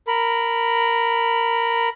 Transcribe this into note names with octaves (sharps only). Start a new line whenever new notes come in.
A#4 B5